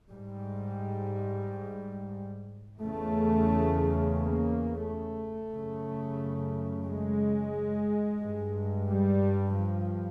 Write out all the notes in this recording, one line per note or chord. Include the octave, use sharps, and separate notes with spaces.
G#2 G3
E2 C#3 A3
A#3
A3
F#2 C#3
G#3
G2
G3
F3